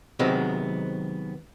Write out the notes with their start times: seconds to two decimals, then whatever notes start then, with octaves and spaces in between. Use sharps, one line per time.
0.19 C3 D#3 F#3 G#3 B3 C4